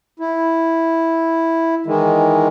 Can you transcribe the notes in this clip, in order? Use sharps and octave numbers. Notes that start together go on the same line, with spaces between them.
E4
D#3 E3 G#3